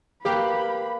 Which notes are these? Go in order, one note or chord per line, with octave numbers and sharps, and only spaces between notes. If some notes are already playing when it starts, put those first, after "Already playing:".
A#3 G4 B4 F5 B5